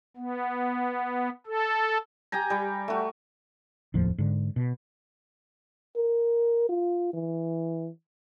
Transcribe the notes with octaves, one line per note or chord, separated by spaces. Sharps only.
B3
A4
G4 G5 G#5 A#5
G3 G5
A3 F#4
F1 D#2 A2 F3
G#2 D3
B2
A#4
F4
E3